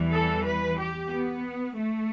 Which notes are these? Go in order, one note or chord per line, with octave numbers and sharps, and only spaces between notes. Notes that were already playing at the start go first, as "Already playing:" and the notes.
Already playing: E2 E3 G3
A4
B4
G4
B3
A3